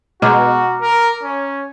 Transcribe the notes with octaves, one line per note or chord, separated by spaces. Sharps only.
B2 G#3 F#4 A#5 D6 F6
A#4
C#4